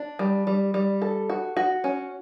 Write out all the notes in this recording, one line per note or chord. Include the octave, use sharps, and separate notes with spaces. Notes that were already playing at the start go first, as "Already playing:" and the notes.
Already playing: D4
G3
G3
G3
A4
F#4
F#4
C#4